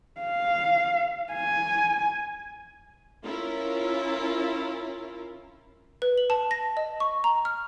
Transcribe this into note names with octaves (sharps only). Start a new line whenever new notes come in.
F5
G#5
C#4 E4 F4 A#4
B4
F#7
A5
A#6
D#5
C#6
A#5
F6